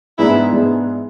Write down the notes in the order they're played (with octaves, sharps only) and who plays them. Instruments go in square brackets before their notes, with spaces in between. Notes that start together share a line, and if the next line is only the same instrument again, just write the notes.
[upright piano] G#2 E3 G#3 B3 D4 [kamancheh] E4
[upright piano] G#2 E3 G#3 B3 D4